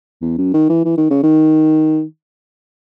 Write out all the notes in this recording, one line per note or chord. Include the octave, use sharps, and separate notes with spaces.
E2
F#2
D#3
E3
E3
D#3
C#3
D#3